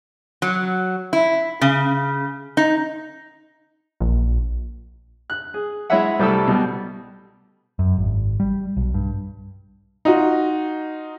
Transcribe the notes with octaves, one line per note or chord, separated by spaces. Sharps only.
F#3
E4
C#3
D#4
A#1
F#6
G#4
G#3 E4 G#4 C#5 E5 F#5
C2 G3 A3 A4 E6
B2 G3
F#2
G#1
G3
B1
G2
D#4 F4 F#4